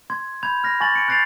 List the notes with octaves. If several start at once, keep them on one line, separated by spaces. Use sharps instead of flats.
C6 G#6
B5 G6 G#6 F7
F6 A#6
G#5 C#6 D6 A6 A#6 F#7
A#6 C#7 D7
F#6 G6 A6 C7 D7 F7